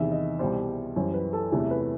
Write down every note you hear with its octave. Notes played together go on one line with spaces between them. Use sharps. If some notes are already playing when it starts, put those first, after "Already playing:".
Already playing: E2 C3 D#3 E5
D#5
C2 B2 G3 C5
F#2 E3 G3 C5
B4
A4
E2 C3 E3 A3 A4
B4